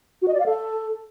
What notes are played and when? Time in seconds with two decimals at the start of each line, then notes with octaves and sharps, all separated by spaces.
0.22 F#4
0.28 D#5
0.34 D5
0.40 F5
0.46 A4